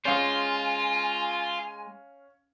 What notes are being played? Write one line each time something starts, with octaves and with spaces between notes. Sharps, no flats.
G#3 C#4 F4 C5 F5 G#5